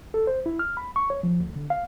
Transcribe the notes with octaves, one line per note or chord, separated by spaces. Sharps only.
A4
C5
E4
F6
B5
C#6
C#5
F3
D2
D3
F5